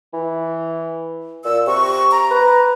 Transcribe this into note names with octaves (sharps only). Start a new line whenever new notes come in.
E3
A#2 E6
C3 C#6
A#5
B4